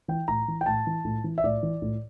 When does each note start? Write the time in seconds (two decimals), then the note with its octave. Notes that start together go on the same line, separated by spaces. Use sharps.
0.08 E3 G5
0.28 A2 A#5
0.48 E3
0.61 G5
0.66 A2 A5
0.87 E3
1.05 A2
1.24 E3
1.38 E5
1.44 A2 D5
1.63 E3
1.82 A2